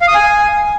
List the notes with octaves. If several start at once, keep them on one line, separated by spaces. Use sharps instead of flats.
F5
D#6
G#5